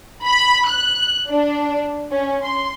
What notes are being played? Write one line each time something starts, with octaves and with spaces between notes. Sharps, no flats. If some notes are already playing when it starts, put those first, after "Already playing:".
B5
F#6
D4
C#4
C6